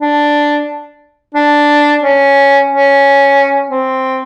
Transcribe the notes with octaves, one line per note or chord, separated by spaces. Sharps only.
D4
D4
C#4
C#4
C4